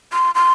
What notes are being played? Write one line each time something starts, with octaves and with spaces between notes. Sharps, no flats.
C6
C6